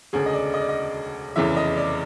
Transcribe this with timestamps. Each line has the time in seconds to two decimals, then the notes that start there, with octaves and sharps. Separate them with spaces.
0.13 E1 D2 C#3 G#4
0.26 D#5
0.33 D5
0.54 D#5
0.61 D5
0.69 D#5
1.36 F1 E2 C#3 E3 E5
1.56 D#5
1.77 D5